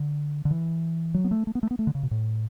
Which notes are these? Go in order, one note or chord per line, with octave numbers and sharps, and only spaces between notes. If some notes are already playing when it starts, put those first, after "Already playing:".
Already playing: D3
D3
E3
F#3
B3
A3
A3
B3
A3
B3
A3
D3
C#3
B2
A2